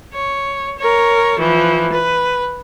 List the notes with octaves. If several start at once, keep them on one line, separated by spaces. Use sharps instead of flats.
C#5
A#4 C#5
E3 F3
B4